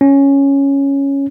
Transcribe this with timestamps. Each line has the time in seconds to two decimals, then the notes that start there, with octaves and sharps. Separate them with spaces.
0.01 C#4